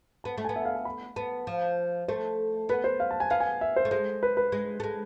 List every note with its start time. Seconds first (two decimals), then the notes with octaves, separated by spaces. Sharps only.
0.24 B3 A5
0.38 A3
0.45 G#5
0.49 B3
0.56 E5
0.65 F5
0.75 G#5
0.85 B5
1.16 B3 A5
1.47 F3
2.08 A3 C5
2.69 B3 B4
2.84 C5
3.00 F5
3.11 A5
3.20 G#5
3.30 B3 F5
3.40 G#5
3.61 E5
3.76 C5
3.85 A3
3.91 G#3 C5
4.23 B4
4.37 B4
4.52 G#3
4.80 A3
4.84 G#3